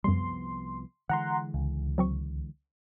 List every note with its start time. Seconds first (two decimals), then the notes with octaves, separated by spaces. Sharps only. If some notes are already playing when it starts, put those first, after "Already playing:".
0.04 C2 F#2 F3 G3 B3 C6
1.09 D3 E3 G#3 F#5 A#5 C6
1.54 C#2
1.98 F#3 C4 C#6